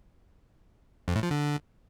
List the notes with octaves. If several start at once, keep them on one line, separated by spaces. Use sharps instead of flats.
F2
A2
F3
D3